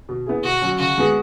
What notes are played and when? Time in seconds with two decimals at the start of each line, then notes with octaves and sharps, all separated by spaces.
0.09 B2
0.26 B3 E4 G#4
0.44 B2 F#4
0.62 F#3 C#4
0.79 C#3 F#4
0.98 G#3 B3 G#4